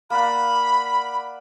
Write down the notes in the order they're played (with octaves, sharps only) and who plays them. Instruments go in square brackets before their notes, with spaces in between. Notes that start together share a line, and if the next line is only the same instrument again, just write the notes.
[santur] A#3 D5 F#5 [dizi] B5